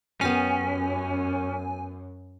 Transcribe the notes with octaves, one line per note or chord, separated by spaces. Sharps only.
F#2 B3 C#4 G4 F5 G#5